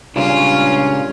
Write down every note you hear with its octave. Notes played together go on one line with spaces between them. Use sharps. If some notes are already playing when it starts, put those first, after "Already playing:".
C#2 G2 A#2 C#3 C#4 F4